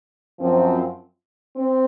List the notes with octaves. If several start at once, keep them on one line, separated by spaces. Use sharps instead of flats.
F#2 F3 C4
C4